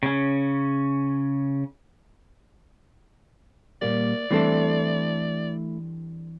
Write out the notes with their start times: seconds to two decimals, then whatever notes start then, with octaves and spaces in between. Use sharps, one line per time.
0.03 C#3 C#4
3.82 A#2 G3 A#3 D5
4.31 E3 G3 A3 C4 D4 E4 A4